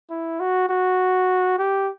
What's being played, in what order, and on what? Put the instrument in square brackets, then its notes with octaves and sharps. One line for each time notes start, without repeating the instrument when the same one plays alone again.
[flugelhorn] E4
F#4
F#4
G4